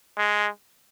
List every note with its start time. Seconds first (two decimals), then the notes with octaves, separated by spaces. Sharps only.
0.17 G#3